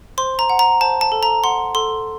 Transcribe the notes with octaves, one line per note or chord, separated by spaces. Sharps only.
C5 C6
A#5
F#5
A#5
C5 A5
A5
A4
A#5
F#5 C6
A4 C6